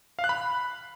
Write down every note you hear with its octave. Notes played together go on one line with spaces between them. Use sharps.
F5
F#6
B5